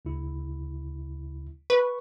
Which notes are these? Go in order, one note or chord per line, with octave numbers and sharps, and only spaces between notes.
D2 C#3 E4
B4 C#6